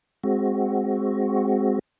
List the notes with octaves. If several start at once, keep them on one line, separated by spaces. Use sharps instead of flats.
G#3 C4 F#4